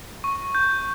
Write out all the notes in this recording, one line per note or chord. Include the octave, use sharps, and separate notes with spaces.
C#6
G6